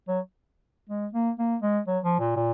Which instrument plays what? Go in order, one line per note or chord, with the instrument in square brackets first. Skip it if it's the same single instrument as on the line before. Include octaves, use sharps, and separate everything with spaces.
[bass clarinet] F#3
G#3
A#3
A#3
G#3
F#3
F3
A#2
A#2